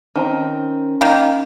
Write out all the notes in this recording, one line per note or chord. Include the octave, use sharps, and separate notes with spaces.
D#3 C4 C#4 A#5
D#3 A#3